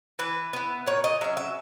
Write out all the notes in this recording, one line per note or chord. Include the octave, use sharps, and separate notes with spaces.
E3 B4
B3 E4
A#2 C#5
D#5
F#3 C#4 E5
E5